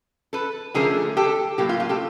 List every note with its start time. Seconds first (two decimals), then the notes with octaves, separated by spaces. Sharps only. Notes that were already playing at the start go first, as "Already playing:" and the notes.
0.33 A4 B4
0.74 D3 F3 A3 C#4 G#4 A#4
1.17 G4 A4
1.58 A2 F#3 A#3 G4
1.69 F4
1.80 F4
1.89 G4 A4